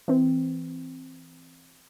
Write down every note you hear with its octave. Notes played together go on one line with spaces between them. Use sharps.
E3 C4